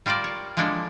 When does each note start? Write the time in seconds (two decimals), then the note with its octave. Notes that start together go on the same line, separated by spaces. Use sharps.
0.06 G3 F4 A#4 C5 D5
0.24 C#5
0.57 F3 G#3 A#3 D4 E4 A4